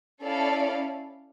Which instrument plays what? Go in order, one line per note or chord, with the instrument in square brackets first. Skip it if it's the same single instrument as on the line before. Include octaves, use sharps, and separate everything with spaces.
[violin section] C#4 E4 A4 D5 F5